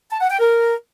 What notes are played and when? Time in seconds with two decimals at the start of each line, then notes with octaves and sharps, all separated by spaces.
0.11 A5
0.20 F#5
0.30 G5
0.39 A#4